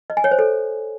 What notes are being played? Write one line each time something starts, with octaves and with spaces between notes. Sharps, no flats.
D#5
G#5
C#5
C5
A4